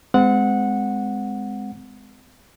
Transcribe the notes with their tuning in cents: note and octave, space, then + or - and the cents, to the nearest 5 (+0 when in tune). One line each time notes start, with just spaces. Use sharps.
G#3 +0 C4 -35 F#5 -15